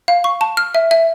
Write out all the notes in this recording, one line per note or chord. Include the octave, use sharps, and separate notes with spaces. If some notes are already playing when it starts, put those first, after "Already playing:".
F5
C#6
A5
F6
E5
E5